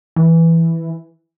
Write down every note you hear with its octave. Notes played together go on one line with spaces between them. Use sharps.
E3